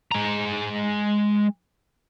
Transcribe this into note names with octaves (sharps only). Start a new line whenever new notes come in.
G#3 A#5